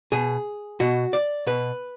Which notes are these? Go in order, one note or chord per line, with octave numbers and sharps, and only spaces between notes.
B2 G#4
B2 F#4
D5
B2 B4